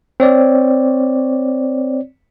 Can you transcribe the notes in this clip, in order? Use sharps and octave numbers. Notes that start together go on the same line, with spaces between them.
C4 C#5 D5